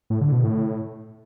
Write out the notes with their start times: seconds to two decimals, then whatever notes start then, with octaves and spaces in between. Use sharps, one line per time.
0.10 A2
0.21 D3
0.32 B2
0.43 A2